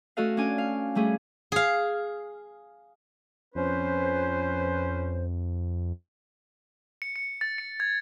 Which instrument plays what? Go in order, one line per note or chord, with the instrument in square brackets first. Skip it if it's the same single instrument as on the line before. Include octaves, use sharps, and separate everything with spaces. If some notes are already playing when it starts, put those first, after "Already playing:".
[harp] A3 C#4 F#4 A4 D#5 F5
C#4 D4 D5 G#5
F5
G3 A3 C#4 G#4
[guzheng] G#4 F5
[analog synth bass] F2 [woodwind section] C#4 B4 C5
[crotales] C#7
C#7
A6
C#7
G#6